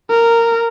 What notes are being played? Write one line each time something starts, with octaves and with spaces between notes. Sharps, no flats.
A#4